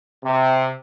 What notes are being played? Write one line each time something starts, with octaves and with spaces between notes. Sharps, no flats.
C3